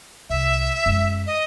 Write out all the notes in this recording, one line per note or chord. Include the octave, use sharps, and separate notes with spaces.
C2 E5
F#2 G#3
D#5